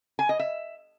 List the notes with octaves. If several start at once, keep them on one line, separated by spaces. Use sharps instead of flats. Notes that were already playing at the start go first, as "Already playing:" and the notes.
G#5
D#5
E5